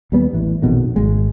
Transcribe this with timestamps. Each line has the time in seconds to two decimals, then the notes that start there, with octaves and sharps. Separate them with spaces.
0.12 D#2 G3 B3
0.33 A1 E3
0.62 A#1 F2 B2 D#3
0.96 G#1 G#3